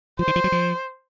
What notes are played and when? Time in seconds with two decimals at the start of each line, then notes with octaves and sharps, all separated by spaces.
0.19 F3 C5
0.28 D#3
0.36 F3
0.44 F#3
0.52 F3